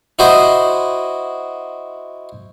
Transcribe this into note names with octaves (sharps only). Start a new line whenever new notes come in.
E4 F#4 C5 D#5